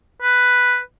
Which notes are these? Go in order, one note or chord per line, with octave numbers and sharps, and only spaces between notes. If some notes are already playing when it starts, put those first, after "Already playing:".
B4